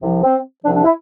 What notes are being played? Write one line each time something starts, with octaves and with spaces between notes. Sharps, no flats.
C2 C3 F3
C4
C2 C3 F3 D4
D4
E4